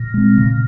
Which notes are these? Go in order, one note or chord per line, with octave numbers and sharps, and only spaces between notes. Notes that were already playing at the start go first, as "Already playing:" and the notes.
Already playing: A#2
G#3 C4
C#3